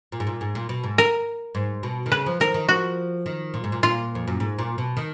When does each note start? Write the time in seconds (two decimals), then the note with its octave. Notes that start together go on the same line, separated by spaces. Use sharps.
0.12 A#2
0.20 G#2
0.27 A#2
0.41 G#2
0.55 A#2
0.69 B2
0.84 G#2
0.98 A#4
1.55 G#2
1.83 B2
2.06 D#3
2.12 C#3 B4
2.26 F3
2.40 D#3 A#4
2.54 D#3
2.69 F3 F#4
3.26 D#3
3.54 A#2
3.64 G#2
3.72 A#2
3.83 A#2 F4
4.15 F2
4.28 F#2
4.40 G#2
4.59 A#2
4.78 B2
4.97 D#3